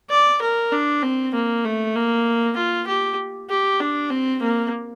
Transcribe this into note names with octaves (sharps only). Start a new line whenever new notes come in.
D5
A#4
D4
C4
A#3
A3
A#3
F4
G4
G4
D4
C4
A#3